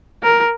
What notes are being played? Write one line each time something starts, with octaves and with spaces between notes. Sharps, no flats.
A#4